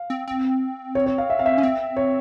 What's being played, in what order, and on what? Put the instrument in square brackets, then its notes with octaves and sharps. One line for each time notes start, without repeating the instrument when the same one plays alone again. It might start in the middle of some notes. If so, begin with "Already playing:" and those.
Already playing: [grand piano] F5
[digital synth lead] C4
C4
[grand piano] C#5
C#5
F5
E5
F5
E5
[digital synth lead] C#4
C4
[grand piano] C#5